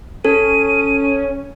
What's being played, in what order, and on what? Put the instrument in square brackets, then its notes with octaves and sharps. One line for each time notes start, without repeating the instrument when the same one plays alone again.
[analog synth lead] C#4 [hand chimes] A4 [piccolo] D#7